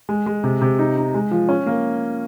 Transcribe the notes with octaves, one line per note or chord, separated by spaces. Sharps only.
G#3
G#3
C3
C3
D#4
D#4
G#3
F3
C#4
A#3